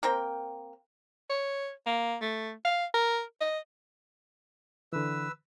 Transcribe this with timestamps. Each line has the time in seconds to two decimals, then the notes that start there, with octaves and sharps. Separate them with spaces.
0.03 A#3 C4 A#4 G5
1.30 C#5
1.86 A#3
2.22 A3
2.65 F5
2.94 A#4
3.41 D#5
4.93 D3 E3 B4 E6